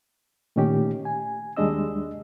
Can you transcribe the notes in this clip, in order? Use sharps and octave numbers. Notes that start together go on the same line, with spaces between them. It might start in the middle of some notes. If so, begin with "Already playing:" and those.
A#2 D#3 A3 C#4 D#4 G4
G#5
D#2 G3 G#3 D4 D#5 E6